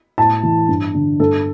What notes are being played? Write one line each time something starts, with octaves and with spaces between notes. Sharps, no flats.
A2 A5
E3
G2
D3
G2 A4